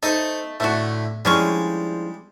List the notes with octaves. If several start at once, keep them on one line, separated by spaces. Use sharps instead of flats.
A3 D#4 A4 C5 A5
A2 D3 A3 E4 F#4
D3 F3 G3 G#3 C#4 E4 G#4 C#6